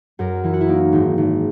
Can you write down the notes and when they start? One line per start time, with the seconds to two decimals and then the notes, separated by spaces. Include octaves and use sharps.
0.19 F#2 A#4
0.44 E3 E4
0.53 F#4
0.61 E4
0.68 A#3 D#4
0.92 G#1 D#4
1.18 G#1